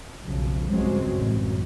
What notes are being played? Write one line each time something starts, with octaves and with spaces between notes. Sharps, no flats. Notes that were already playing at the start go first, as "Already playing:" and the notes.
B1 F2 C#3 F3
C#2 G2 F#3 G#3 C4
A1 F#2